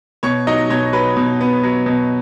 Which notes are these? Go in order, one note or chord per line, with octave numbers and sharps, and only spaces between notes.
B2 C#5 C#6
F#3 D#4 D#5
B2 C#5
F#3 B4
B2
B3
F#3
B2